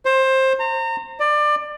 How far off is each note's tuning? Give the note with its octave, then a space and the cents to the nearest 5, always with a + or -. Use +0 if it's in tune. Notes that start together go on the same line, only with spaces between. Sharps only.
C5 +20
A#5 -30
D5 +25